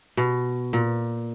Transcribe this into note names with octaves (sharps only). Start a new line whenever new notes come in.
B2
A#2